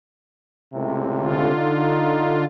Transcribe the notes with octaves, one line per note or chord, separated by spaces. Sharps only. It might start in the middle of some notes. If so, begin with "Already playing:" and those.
C#2 A2 C3
D3 F4
D#4